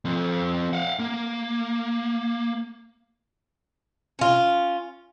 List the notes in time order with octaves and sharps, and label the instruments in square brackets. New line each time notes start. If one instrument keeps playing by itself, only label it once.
[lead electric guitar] F3 C4
F5 F#5
A#3
[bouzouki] C#4 F4